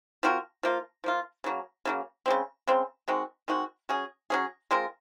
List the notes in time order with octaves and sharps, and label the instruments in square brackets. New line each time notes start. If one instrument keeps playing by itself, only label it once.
[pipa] F3 C4 F#4 A#4
F3 A#3 F4
F3 A#3 F4
C#3 F#3 A#3
C#3 F#3 A#3
C#3 G#3 C4
C#3 G#3 C4
D#3 G#3 C4 F#4
D#3 G#3 C4 F#4
F#3 C#4 G#4
F#3 C#4 G#4
G#3 C4 F4 A#4